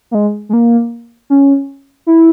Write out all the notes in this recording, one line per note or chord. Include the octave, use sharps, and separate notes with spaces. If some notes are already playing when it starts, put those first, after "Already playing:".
A#3
G#3
G#3
A#3
C#4
E4